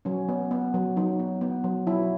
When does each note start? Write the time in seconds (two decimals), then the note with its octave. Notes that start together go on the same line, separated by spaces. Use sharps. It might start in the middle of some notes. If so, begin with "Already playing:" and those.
0.05 F#3 C#4
0.29 B3
0.51 B3
0.74 F#3
0.96 F#3 D#4
1.20 B3
1.41 B3
1.64 F#3
1.87 F#3 E4